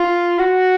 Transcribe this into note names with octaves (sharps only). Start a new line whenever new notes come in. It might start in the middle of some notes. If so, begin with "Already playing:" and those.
Already playing: F4
F#4